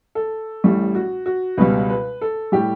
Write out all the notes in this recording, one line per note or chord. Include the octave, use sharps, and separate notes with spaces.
A4
A1 A2 G3
F#4
F#4
C#2 B2 G3 B4
B4
A4
A2 G3 G4